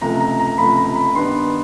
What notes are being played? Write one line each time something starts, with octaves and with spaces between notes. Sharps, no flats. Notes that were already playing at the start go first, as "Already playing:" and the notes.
C#2 C3 F3 A3 A#5
A#5
A#5
C#2 C3 F3 A3 B5
A#5
B5
G2 D#3 G3 B3 D4 C6